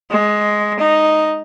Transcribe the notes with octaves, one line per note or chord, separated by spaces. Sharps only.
G#3
D#4